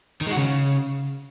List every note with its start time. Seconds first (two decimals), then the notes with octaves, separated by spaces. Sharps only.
0.21 D#3
0.26 G#3
0.32 F#4
0.37 C#3